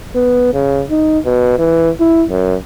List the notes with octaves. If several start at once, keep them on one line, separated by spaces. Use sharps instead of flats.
B3
C#3
D#4
B2
E3
E4
F#2